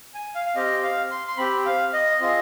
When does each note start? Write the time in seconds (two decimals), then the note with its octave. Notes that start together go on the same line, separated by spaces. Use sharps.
0.15 G#5
0.35 F5
0.46 F5
0.55 C4 G4 D#5
0.83 F5
1.11 C6
1.27 C6
1.37 C4 G4 B5
1.66 F5
1.93 D#5
2.20 C4 F4 G#4 D#5